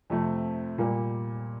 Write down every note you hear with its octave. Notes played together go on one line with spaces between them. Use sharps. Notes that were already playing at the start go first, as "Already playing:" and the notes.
F2 C3 F3 A3
A#2 G3 A#3